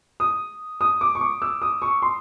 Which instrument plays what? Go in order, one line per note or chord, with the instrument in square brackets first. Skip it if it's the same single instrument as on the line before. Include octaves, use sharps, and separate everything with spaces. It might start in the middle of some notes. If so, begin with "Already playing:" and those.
[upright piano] D#6
D#6
D6
C#6
D6
E6
D#6
C#6
C6